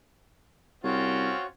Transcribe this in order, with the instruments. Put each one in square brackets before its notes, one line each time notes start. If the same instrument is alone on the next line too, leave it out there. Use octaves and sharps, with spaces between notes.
[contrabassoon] C2 [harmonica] C4 C#4 F4 [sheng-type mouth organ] F#4 C#5